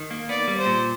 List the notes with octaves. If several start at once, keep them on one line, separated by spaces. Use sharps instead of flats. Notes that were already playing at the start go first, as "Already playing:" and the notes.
Already playing: D#3
A#3
B3 D5
G3
C5
A#2